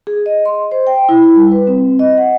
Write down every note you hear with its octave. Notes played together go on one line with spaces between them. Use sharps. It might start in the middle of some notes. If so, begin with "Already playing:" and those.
G#4
D#5
C6
C5
G5
E4
E4
G3
B4
C4
D#5
F#5